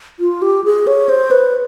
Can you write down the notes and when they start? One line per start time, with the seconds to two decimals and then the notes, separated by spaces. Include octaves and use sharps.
0.20 F4
0.42 G4
0.64 G#4
0.87 C#5
1.09 C5
1.31 B4